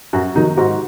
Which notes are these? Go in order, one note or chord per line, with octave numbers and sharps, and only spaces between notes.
F#2 F#4
D#3 F#3 D#4
G#2 F#4